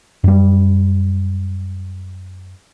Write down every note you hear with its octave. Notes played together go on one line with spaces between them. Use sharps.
F#2 G3